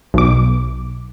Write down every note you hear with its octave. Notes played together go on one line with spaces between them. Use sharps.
B1 D6